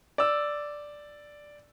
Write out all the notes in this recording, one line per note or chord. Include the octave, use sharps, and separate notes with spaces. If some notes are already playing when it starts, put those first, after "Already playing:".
D5 E6